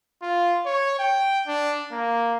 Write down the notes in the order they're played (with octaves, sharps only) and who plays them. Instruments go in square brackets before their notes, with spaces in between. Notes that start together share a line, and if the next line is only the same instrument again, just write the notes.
[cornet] F4
C#5
G5
D4
A#3